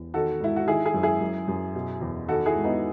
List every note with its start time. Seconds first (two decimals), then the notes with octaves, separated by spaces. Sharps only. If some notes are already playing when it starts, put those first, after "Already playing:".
Already playing: E2
0.14 D#3 F#4 A4
0.40 G#2 E4
0.56 F#4
0.67 D#3 E4 G#4
0.85 E4 G#4
0.94 F#2
1.03 E4 G#4
1.21 F#2
1.48 F#2
1.75 B2
2.01 E2
2.28 D#3 F#4 A4
2.46 E4 G#4
2.55 G#2
2.64 B3 D#4